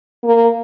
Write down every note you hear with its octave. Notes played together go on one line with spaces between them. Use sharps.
A#3